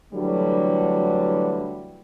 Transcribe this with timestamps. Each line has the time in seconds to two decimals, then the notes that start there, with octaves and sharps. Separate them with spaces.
0.13 D3 E3 F#3 G3 A3